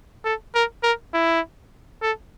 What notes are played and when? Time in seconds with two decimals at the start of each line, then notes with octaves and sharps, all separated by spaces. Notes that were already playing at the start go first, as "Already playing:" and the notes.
0.25 A4
0.55 A#4
0.83 A#4
1.14 E4
2.02 A4